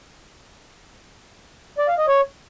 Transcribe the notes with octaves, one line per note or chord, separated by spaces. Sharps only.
D5
F5
D#5
C#5